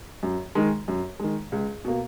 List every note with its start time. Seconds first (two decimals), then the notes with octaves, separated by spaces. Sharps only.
0.23 F#2
0.55 D#3 G#3
0.88 F#2
1.20 D#3 G#3
1.52 C#2
1.85 B2 A#3